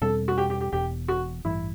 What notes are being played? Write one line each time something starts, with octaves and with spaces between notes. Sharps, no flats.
E2 B2 G3 C4 A4
F#4
G4
G4
G4
E1 E2 B2 G4
F#4
A1 G2 E3 G3 E4